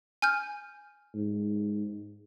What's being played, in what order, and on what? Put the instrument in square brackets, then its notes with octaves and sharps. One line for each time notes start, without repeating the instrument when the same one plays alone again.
[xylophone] G#5 F6 G6
[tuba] G#2